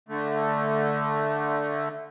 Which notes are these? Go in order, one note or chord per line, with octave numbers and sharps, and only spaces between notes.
D3 A3